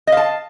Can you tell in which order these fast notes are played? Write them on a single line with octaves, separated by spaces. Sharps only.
D#5 F5 A5